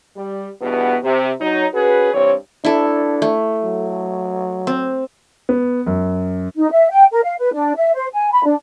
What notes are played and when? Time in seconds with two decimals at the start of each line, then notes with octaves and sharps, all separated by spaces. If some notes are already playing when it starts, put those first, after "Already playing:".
0.16 G3
0.61 E2 G2 B2 B3
1.03 C3
1.40 F#3 D#4 C#5
1.73 C#4 F#4 G#4 B4
2.14 G2 E3 C4 C#5
2.65 D4 E4 A4
3.22 A3
3.64 F#3
4.67 C4
5.49 B3
5.87 F#2
6.56 D#4
6.71 E5
6.90 G5
7.11 A#4
7.23 F5
7.39 B4
7.52 D4
7.76 E5
7.95 C5
8.13 G#5
8.32 B5
8.44 D4